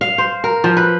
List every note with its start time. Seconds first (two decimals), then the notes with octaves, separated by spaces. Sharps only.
0.01 F5
0.18 C5
0.44 A#4
0.64 F3
0.77 B4